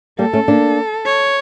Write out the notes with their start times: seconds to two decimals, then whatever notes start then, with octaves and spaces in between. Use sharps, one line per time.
0.19 G3 A#3 A4
0.33 A3 C#4
0.48 A#3 D4
1.06 C#5